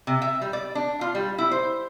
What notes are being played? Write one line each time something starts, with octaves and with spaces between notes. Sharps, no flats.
C3
E5
G3
D5
D4
F4
G3
E4
C5